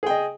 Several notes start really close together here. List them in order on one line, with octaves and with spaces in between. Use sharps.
G#4 G5 D#5